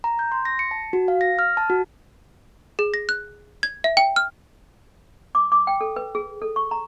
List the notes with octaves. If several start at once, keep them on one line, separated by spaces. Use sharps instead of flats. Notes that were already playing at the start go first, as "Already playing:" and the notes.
A#5
G6
C6
A#6
C#7
A5
F#4
F5
A#6
F6
A5
F#4
G#4
A#6
F#6
G#6
E5
G5
F6
D6
D6
G5
A4
B4
G#4
A4
C#6
A#5